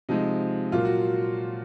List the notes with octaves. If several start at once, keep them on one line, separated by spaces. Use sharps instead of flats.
C3 F3 G#3 D#4
A#2 F#3 A#3 F4
F#4